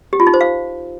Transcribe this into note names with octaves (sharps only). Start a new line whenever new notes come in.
G4
F4
D#4
C5
F5